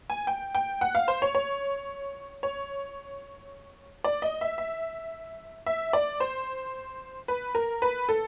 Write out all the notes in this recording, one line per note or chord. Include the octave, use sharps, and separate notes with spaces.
G#5
G5
G5
F#5
F5
C5
C#5
C#5
C#5
D5
D#5
E5
E5
E5
D5
C5
B4
A#4
B4
A4